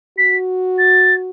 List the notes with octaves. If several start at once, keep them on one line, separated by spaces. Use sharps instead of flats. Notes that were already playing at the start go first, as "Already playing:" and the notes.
F#4 B6
A6